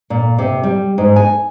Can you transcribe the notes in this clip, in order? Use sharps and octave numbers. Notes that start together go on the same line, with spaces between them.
A#2
C3
G3
G#2
G#5